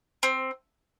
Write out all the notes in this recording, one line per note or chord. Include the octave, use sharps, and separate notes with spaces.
C4